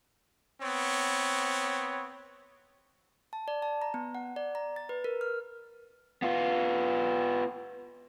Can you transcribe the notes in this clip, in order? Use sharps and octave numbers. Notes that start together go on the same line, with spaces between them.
B3 C4 C#5
A5
D5
A5
A#5
B3
F#5
D5
A#5
A6
B4
A#4
F6
B3 F4